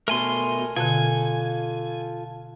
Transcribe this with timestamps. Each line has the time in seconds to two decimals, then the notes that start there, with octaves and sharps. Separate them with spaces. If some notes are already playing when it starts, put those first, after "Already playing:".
0.08 B2 A3 A#4 G#5 C6
0.76 B2 D3 F4 A4 G#5